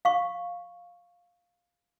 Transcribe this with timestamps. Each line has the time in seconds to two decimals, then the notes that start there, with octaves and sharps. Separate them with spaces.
0.05 F5 C#6